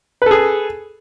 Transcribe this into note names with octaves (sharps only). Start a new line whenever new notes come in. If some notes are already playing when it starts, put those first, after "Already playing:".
G#4 A4 B4